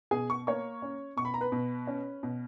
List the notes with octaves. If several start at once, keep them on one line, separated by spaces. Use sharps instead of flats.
B2 G#4 G#5
C#6
A#3 C#5 C#6
C#4
B2 C#6
B5
A#5
B4 B5
B2
C#4
B2